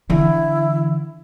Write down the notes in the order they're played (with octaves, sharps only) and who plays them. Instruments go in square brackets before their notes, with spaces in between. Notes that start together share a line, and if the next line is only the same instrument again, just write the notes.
[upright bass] D3 E3 [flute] E4